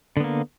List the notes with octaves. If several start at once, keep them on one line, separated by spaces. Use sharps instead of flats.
D3 A#3 B3